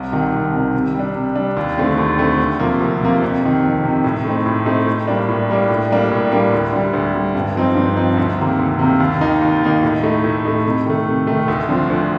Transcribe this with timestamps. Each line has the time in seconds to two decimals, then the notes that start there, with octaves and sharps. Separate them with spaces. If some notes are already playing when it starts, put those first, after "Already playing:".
Already playing: C2
0.12 C3 D#3
0.32 C2
0.53 C3 D#3
0.74 C3
0.94 G3 D4
1.15 C3
1.36 G3 D4
1.57 D#2
1.77 D3 A3 C4
1.98 D#2
2.18 D3 A3 C4
2.39 D2
2.60 C3 F3 A#3
2.80 D2
3.01 C3 F3 A#3
3.22 F2
3.42 C3 D#3
3.63 F2
3.84 C3 D#3
4.04 A2
4.25 A3 C4 D#4
4.46 A2
4.66 A3 C4 D#4
4.87 A2
5.08 G3 A#3 D4
5.28 A2
5.49 G3 A#3 D4
5.69 A2
5.91 G3 A#3 D4
6.11 A2
6.32 G3 A#3 D4
6.52 D2
6.73 D3 G3
6.93 D2
7.15 D3 G3
7.35 G2
7.56 F3 C4 D#4
7.77 G2
7.97 F3 C4 D#4
8.17 D2
8.39 C3 D#3 A#3
8.59 D2
8.79 C3 D#3 A#3
9.00 D#2
9.21 D#3 A#3 D#4
9.42 D#2
9.62 D#3 A#3 D#4
9.83 A2
10.03 A3 D#4
10.24 A2
10.45 A3 D#4
10.65 C3
10.86 D#3 A3
11.06 C3
11.27 D#3 A3
11.48 D2
11.69 D3 F3 C4
11.90 D2